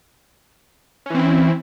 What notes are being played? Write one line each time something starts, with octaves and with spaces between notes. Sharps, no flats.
E3 C4 C#4 E4